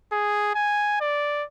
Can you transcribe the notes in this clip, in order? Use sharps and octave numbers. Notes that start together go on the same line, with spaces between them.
G#4
G#5
D5